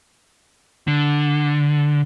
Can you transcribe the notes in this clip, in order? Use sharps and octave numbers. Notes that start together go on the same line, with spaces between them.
D3